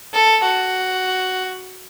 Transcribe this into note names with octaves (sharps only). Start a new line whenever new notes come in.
A4
F#4